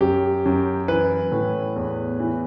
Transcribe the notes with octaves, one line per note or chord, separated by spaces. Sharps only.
F#2 G4
F#2
E3 B4
A2
E2
E3